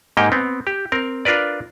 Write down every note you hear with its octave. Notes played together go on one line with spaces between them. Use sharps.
G#2 A#3 D#4 G4 G5
B3 C4
G4
C4 A#4
D4 F4 A#4 B4 D5